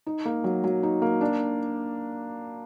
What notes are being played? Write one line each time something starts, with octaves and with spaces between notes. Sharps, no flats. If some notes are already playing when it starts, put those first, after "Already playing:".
D#4
A#3
F#3
F#3
D#4
A#3
D4